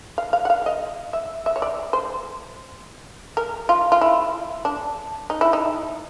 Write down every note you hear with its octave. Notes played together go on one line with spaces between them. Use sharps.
F5
F5
F#5
F5
D#5
E5
E5
C#5
D5
C5
A#4
F4
F4
E4
D4
D#4
E4
D#4